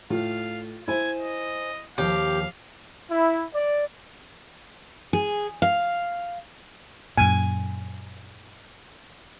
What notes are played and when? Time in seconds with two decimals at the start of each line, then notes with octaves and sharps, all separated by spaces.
0.10 A2 F4 F5
0.88 E4 C5 G#5 G#6
1.19 D#5
1.98 D#2 F3 G4 A#4 F5
3.11 E4
3.55 D5
5.13 G#4
5.62 F5
7.17 F#2 A#2 G#5